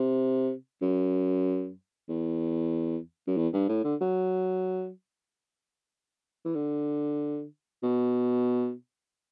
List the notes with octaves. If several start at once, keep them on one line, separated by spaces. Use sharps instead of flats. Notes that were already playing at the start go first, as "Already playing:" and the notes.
Already playing: C3
F#2
E2
F#2
E2
G2
A2
D3
F#3
E3
D3
B2